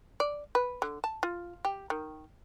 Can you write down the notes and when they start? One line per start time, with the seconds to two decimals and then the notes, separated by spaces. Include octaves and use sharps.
0.20 D5
0.55 B4
0.82 D3
1.04 A5
1.23 F4
1.65 G4
1.90 D#3